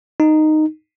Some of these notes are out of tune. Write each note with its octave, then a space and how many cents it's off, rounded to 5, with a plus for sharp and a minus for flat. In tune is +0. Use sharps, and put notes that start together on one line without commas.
D#4 -10